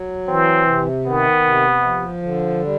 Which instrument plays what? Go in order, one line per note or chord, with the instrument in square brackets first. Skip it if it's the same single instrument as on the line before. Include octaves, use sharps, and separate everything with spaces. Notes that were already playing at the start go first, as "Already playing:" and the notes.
Already playing: [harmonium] F#3
[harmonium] E3 [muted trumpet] C4
[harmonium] C3
[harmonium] D#3 [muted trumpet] B3
[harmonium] C3
F3
D3
G3